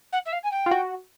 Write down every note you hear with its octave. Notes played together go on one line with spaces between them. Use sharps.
F#5
E5
F5
G#5
G5
F4
F#4